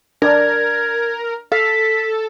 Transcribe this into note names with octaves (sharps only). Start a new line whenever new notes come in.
D4 A#4 D5 G#6
A4 F5 B6